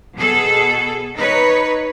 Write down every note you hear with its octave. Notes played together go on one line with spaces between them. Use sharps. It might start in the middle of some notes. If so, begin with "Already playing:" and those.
B2 G#4 A4
D#4 B4 C#5